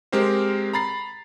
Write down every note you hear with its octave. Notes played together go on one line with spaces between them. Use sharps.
G#3 C4 G4 A#4 C5
A#5 B5 A6 C7